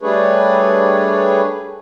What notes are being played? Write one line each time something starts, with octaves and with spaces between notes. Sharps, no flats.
G3 A3 D4 G#4 B4 C#5